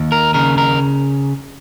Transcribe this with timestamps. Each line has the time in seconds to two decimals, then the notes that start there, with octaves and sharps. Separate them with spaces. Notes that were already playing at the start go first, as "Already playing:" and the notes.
Already playing: D#2
0.12 A#4
0.34 C#3 A#4
0.58 A#4